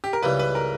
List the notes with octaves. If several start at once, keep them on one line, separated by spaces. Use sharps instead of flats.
G4
A#4
C#2 C#3 E3 G3 B4
B4
A#4